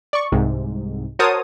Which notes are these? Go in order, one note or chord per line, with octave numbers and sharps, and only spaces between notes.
D5 C#6
C2 G#2 C3
F#4 A#4 C5 C#5 A5 D#6